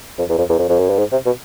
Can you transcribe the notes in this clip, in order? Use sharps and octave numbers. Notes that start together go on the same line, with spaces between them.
F2
E2
F2
E2
F2
F2
F#2
G2
G#2
C3
B2